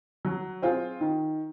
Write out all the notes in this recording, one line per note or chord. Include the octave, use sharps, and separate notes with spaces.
F#3
C4 F4 G#4
D#3